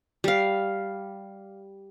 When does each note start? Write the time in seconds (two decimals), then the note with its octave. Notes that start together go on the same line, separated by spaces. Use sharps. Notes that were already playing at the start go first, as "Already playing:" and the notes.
0.24 G3 F5